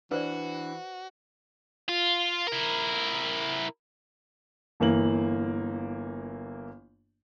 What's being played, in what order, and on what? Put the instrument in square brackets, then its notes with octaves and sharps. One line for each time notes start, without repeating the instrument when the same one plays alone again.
[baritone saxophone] E3 [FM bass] D4 [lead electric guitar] F#4 [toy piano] B4 C5 D5
[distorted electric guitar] F4
E4 A#4
[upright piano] G1 E3 A#3 F#7